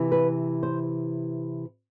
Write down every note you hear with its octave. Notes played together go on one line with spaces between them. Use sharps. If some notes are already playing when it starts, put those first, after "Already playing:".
Already playing: C3 E3
B4
C5